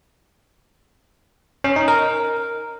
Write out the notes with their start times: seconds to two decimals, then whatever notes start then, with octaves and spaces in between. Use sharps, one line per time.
1.64 C#4
1.76 D#4
1.88 A#4